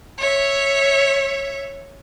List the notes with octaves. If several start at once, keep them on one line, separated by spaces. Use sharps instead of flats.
C#5 E5